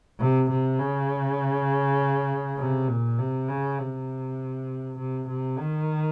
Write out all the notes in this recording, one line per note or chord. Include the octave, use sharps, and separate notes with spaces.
C3
C3
C#3
C3
A#2
C3
C#3
C3
C3
C3
D#3